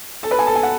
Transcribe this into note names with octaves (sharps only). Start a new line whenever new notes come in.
A4 A5
B4 B5
G#5
A4 A5
G#5
F#5